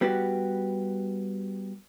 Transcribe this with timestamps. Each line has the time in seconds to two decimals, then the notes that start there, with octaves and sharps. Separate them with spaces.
0.01 G3 B3 F#4 G4